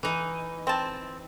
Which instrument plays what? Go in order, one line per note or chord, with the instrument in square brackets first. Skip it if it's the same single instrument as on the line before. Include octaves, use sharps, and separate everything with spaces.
[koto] E3 D#4
[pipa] C4 A5